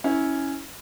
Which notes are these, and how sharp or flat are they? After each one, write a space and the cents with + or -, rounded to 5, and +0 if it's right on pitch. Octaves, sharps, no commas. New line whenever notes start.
C#4 +0 E4 -25